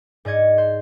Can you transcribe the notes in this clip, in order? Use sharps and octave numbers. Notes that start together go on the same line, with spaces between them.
G#2 D5 D#5 G#6 C#7
C5